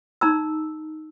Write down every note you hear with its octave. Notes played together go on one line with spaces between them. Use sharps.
D#4 A#5 E6